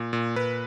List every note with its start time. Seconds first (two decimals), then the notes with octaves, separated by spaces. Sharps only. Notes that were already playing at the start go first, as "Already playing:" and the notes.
Already playing: A#2
0.13 A#2
0.36 A#2 B4